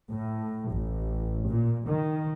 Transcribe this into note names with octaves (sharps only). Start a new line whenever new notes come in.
A2
A1
A#2
D#3